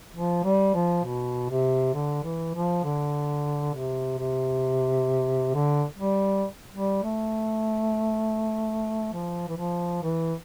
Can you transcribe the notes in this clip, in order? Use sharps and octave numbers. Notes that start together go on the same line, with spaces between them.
F3
G3
F3
B2
C3
D3
E3
F3
D3
C3
C3
D3
G3
G3
A3
F3
E3
F3
E3